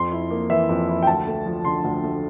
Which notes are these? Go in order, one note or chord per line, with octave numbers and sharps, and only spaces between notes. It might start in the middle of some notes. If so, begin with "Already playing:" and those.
Already playing: F2 C6
E4
A#3
E3 E5
F2
E4
G5
D2 A5
A3
F3
D3 C6
D2
A3